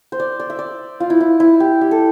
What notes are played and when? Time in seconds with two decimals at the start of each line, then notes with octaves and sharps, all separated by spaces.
0.12 C5
0.20 D5
0.40 D5
0.50 E5
0.59 D5
1.00 F4
1.10 E4
1.20 E4
1.40 E4
1.60 G4
1.81 G4
1.91 A4